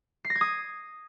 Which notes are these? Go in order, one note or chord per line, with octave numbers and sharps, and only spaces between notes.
C7
A#6
G#6
D#6